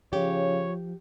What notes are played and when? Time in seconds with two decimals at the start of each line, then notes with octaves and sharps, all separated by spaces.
0.13 C#3 F3 G4 C#5